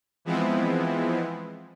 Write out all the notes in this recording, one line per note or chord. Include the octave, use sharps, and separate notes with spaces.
E3 F3 G#3 B3 C4 E4